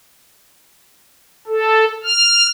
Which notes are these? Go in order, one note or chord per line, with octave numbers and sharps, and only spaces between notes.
A4
F6